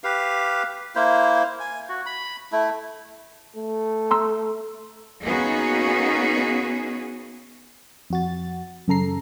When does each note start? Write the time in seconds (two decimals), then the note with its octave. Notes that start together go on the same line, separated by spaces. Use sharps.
0.04 G4 B4 F5
0.95 A#3 E4 C5
1.60 G#5
1.89 F#4
2.06 B5
2.52 A3 E4
3.56 A3
4.11 A#5 C6 E6
5.23 A#3 B3 C#4 D#4 F#4 G#4
8.10 F2 F#4 A6
8.88 F#2 C#3 A4 A#5 C7